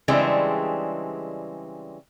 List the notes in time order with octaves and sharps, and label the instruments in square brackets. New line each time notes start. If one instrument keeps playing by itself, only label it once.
[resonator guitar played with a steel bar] C#3 E3 G3 G#3 C4 D4